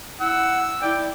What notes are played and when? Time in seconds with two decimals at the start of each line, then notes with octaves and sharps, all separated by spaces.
0.20 E4 F#5 E6
0.81 E4 D5 G5